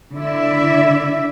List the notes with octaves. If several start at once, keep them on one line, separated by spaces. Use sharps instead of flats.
D3 E4 D5 E5